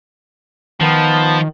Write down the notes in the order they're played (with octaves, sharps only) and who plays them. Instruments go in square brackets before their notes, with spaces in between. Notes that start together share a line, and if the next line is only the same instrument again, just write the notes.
[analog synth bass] D#3 [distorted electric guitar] F3 [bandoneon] B3 A5